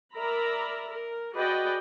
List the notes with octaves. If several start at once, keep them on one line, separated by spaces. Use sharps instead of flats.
A#4 D5 E5 A#5 B5
A#4
F#4 G#4 B4 D5 D#5 G5